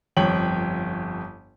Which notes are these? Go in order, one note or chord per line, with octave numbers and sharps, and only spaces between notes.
G1 F2 C#5 G5 F#7